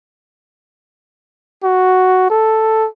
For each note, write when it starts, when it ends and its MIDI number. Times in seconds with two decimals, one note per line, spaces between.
1.63 2.26 66
2.30 2.87 69